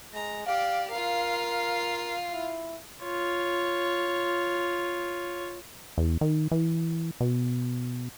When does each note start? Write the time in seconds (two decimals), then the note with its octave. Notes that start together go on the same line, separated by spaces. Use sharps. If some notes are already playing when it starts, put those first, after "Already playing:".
0.14 G#3 A#5
0.46 G4 D5 F5
0.91 F4 A#4 F5
2.33 E4
3.03 F4 C#5
5.98 E2
6.21 D#3
6.51 E3
7.21 B2